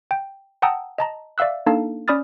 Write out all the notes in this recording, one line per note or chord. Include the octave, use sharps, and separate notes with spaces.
G5
F#5 G5 A5 A#5 D#6 E6
D#5 A5 A#5
D5 E5 F5 E6 F#6
A#3 D4 D#4 A4 F5 A5
C#4 D5 B5 D#6 F6 A6